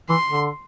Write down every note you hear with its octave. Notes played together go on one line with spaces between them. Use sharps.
E3 C6
D3